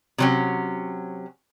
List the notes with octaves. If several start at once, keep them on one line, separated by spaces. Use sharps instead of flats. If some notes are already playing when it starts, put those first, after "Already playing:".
C3 F#3 C#4